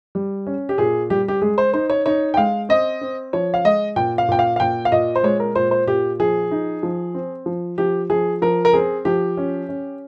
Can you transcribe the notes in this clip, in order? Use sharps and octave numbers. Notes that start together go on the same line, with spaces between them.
G3
C#4
G4
A#2 G#4
G3 G4
G4
G#3 G#4
C5
D#4 C5
C#5
D#4 C#5
G5
G#3 F5
C4 D#5
C4
F3 C#5
F5
G#3 D#5
A#2 G5
F5
A#2 G5
F5
F5
A#2 G5
F5
A#2 D#5
C5
G#3 C#5
A#4
A#2 C5
C5
A#2 G4
F3 G#4
D#4
F3
C4
F3
F3 G4
F3 G#4
F3 A#4
A#4
C4 G#4
F3 G4
C#4
C#4